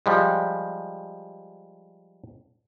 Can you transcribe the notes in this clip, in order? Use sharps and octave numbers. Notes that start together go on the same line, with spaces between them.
F3 G3 G#3